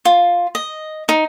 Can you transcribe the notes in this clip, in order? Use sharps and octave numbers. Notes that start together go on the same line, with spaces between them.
F4
D#5
D#4